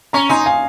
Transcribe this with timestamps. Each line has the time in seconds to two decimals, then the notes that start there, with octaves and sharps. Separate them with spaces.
0.13 C#4 A#5 C#6
0.29 D#4 G#5 C6
0.46 F5 G#5